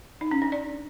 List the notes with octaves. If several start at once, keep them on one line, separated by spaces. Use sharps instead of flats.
D#4
C#4
D4
D5